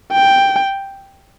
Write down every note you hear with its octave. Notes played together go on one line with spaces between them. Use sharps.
G5